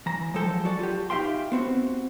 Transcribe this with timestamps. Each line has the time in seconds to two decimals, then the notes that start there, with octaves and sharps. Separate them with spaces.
0.06 E3 A#5
0.34 F3 F#3 G#3 A4 G5
0.65 F#4 D5 A5
0.79 F4 G4
1.10 D#4 G4 E5 F5 G5 C6
1.52 B3 C4 F#4